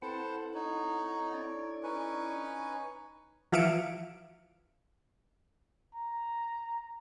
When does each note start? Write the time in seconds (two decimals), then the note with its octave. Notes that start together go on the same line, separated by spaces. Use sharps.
0.02 C4 E4 A4 B4 C5 F#5 A5
0.54 D#4 C#5
1.34 D4 E4 D5
1.83 C#4 D#4 B4 G#5 C#6
3.52 E3 F3 E5 F5 C#7 D7
5.95 A#5